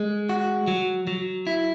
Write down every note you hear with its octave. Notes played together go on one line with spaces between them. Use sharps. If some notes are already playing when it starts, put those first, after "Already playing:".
Already playing: G#3
F#4
F#3
F#3
E4